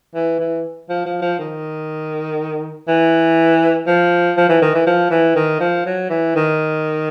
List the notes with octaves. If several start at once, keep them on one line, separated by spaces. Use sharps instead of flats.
E3
E3
F3
F3
F3
D#3
E3
F3
F3
E3
D#3
E3
F3
E3
D#3
F3
F#3
E3
D#3